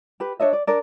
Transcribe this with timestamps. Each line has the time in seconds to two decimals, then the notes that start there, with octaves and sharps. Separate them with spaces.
0.20 G4 B4
0.40 D4 C#5 D#5 E5
0.53 D5
0.67 D4 A#4 D5